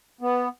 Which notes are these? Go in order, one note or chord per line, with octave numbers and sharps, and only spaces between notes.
B3